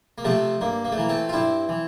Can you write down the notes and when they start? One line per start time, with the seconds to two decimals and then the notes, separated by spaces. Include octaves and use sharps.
0.18 A#3
0.24 C3 F3 A3 C4
0.61 G2 A#3
0.85 A#3
0.92 A3
0.98 E3 A#3
1.09 A3 C4
1.29 F4
1.33 G2 C4 E4
1.69 E3